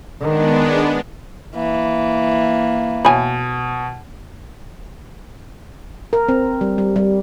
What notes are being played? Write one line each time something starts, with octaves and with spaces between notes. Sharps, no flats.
D#3 G#3 B3 D4
E3 A#3
B2 C#5 G#5 B5
A#4
C4
G3
G3
G3